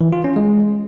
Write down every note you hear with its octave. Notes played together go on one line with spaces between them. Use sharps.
E3
F4
C#4
G#3